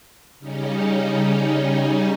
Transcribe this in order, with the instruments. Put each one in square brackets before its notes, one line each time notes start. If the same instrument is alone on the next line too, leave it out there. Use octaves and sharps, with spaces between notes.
[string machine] C#3 G3 C#4 D#4